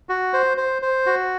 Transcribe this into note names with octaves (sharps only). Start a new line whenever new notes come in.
F#4
C5
C5
C5
F#4